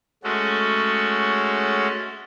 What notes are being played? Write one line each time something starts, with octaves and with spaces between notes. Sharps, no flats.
G#3 A3 C#4 F#4 A4